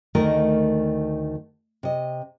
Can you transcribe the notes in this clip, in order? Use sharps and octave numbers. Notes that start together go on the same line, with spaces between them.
D2 D#3 A3 A#4 D#5
C3 D#5